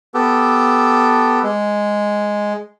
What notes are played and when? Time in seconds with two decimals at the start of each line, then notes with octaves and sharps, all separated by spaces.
0.14 B3 G4 A4
1.43 G#3